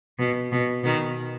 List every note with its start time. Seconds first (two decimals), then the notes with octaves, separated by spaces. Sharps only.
0.19 B2
0.52 B2
0.84 B2 D#3